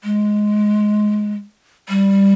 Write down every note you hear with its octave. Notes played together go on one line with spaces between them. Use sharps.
G#3
G3